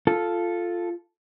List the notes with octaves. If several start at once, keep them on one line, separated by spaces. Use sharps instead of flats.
F4 A4